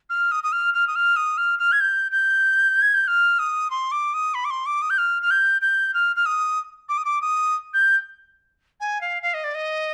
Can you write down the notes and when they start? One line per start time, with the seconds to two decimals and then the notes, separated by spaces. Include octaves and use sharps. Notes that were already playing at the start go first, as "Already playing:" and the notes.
0.10 F6
0.32 D#6
0.44 D#6
0.52 F6
0.74 F6
0.87 D#6
0.96 F6
1.16 D#6
1.38 F6
1.59 F6
1.72 G#6
1.80 G6
2.12 G6
2.82 G#6
2.94 G6
3.08 F6
3.39 D#6
3.71 C6
3.92 D6
4.14 D#6
4.34 B5
4.45 D6
4.50 C6
4.66 D6
4.82 D#6
4.90 G6
4.98 F6
5.22 F6
5.31 G6
5.62 G6
5.94 F6
6.16 F6
6.26 D#6
6.89 D6
6.98 D#6
7.05 D6
7.22 D#6
7.74 G6
8.80 G#5
9.01 F5
9.22 F5
9.34 D#5
9.44 D5
9.55 D#5